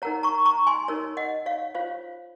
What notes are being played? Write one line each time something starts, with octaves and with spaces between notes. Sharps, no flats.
D#4 A#4 C#5 F#5 A#5
A#5 C#6
A#5 C#6
G#5 C6
D#4 A#4 C#5
D#5 F#5
C#5 F5
F4 C5 C#5 F5